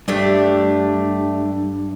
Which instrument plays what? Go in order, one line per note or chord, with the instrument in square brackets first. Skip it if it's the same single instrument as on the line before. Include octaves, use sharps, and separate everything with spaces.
[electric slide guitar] G2 [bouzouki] A3 D4 G4